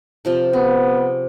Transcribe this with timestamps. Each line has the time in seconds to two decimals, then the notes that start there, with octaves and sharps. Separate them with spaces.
0.25 C3 F3 A5
0.53 B3 G#4